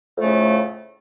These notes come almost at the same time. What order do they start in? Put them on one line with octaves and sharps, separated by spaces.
F2 A3 C#3 A2